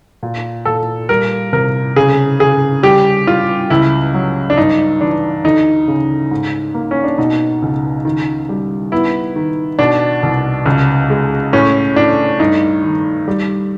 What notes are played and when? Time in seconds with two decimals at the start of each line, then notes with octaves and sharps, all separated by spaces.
0.23 A#2
0.65 A#2 A4
1.09 G3 A#4
1.53 C3 A#4
1.96 C#3 G#4
2.40 C#3 G#4
2.83 G3 G4
3.27 G3 F4
3.70 C#2 E4
4.14 F#3
4.50 D4
4.57 G2 D#4
5.01 E3 D4
5.44 D2 D#4
5.88 C#3
6.31 G#2
6.74 A#3
6.91 C#4
7.04 D4
7.18 B2 D#4
7.62 C#2
8.05 D#3
8.49 G3
8.92 B3 E4
9.36 D#3
9.79 B2 D4
10.23 C2
10.66 C#2
11.10 G#3
11.53 A2 C#4
11.96 A2 D4
12.40 G2 D#4
12.83 D#3
13.28 G3